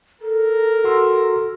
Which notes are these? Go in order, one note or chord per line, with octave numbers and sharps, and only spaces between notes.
A4 A#4
F#4 C6 E6